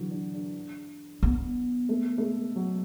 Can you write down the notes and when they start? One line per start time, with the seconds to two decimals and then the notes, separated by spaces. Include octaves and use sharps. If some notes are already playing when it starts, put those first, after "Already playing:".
Already playing: D3 E3 F#3
0.11 D4
0.33 D4
1.23 B3
1.89 A3
2.18 A3
2.22 G#3
2.56 F#3